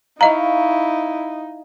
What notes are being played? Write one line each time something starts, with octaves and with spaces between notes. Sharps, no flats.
D#4 E4 D#5 F5 A#5 C#6